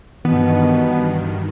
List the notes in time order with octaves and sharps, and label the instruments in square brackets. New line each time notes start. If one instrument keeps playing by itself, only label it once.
[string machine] G2 D#3 [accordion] B2 [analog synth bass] E3 [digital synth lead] B3